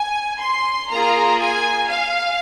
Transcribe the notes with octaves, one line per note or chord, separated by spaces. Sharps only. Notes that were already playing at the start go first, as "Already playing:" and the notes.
Already playing: G#5
C6
A#3 F4 G#4 A#5
G#5
F5